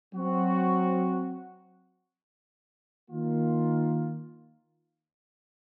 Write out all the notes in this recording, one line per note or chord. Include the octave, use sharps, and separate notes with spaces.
F#3 C4 F#4
D#3 A#3 F4